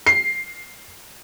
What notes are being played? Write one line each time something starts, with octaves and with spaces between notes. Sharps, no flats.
C7